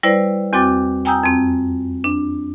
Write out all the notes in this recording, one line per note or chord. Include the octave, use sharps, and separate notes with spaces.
G3 E4 B4 C5 D5
E2 C4 F#4 G5 D6 A6
G5 G#5 A#5 D#6 E6 G6
F2 C4
D4